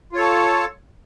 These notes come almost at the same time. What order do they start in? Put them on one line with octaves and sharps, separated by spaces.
F4 C#5 A4 A5